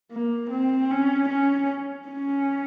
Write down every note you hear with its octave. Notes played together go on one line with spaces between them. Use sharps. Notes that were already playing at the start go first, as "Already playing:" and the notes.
A#3
C4
C#4
C#4
C#4